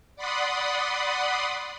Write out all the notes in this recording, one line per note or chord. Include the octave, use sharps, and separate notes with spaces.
D5 F#5 B5 C6 D#6